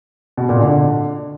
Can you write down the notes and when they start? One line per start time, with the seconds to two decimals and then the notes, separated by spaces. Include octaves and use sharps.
0.37 B2
0.49 A#2
0.61 D3